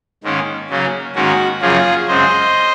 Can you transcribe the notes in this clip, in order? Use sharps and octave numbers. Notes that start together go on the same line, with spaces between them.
G#2 D#3 A#3 C#4
C#3 F#3 A#3 C#4
G#2 D#3 A#3 C#4 F#4
F#2 C#3 F3 A#3 C#4 F4 G#4
F#2 C#3 G#3 C4 C5 D#5